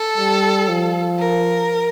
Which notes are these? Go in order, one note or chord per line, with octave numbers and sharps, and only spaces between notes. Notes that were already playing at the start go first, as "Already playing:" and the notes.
Already playing: A4
G3
F3
A#4